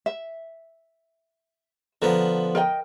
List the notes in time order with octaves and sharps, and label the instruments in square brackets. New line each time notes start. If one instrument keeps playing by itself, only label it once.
[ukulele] E5
[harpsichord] D3 F3 B3 [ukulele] A#4
[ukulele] A#4 D#5 G5